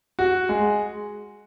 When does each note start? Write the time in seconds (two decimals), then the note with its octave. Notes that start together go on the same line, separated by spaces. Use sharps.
0.19 F#4
0.49 G#3